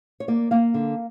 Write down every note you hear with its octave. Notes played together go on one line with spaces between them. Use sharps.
C#5
A#3 D5
A#3 F5
D3